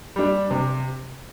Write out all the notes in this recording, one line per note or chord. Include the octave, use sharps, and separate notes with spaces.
G3 D4
C3